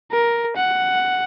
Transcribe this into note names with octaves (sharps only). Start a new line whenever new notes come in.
A#4
F#5